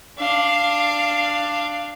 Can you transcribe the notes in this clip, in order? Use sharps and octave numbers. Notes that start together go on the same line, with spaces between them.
D4 F5